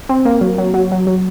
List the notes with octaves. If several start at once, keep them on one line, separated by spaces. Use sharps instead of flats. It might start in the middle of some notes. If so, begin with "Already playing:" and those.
C4
A#3
F#3
F#3
F#3
F#3
F#3